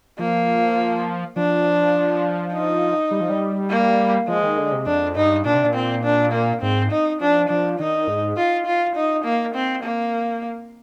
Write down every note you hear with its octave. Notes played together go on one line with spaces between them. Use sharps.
F3 A#3
F3 D4
D#4
G3
F3
G3
A#3
F3 G#3
D#3
D3
C3
F2 D4
G2 D#4
A#2 D4
C3
A#2
C4
D4
A#3
G#2 C4
D#4
F3 D4
F3 D4
D#3 D#4
G#2
F4
F4
D#4
A#3
C4
A#3